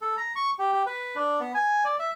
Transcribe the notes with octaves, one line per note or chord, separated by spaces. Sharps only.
A4
A#5
C#6
G4
G4
B4
D4
B3
G#5
D5
E5